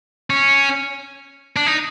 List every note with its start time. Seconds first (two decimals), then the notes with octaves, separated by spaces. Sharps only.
0.30 C#4
1.56 D4
1.66 D#4